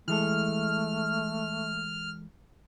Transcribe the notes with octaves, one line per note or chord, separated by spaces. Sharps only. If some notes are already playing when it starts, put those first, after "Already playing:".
E3 G#3 A3 A4 F6